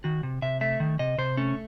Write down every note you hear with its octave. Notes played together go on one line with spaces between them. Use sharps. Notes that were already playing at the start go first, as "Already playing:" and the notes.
D#3 F#4
C3
C3 E5
A3 E5
D#3
C3 D#5
C3 C5
A3 C#4